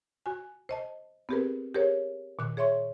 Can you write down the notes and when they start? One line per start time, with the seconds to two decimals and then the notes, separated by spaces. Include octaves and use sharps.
0.26 F#4 G#5
0.69 C5 D#5 A5
1.29 B3 C4 G4 G#4 A#4 B4
1.74 G4 G#4 A#4 C5 C#5
2.39 A#2 D#3 F#6
2.57 G#4 C#5 E5 C6 C#6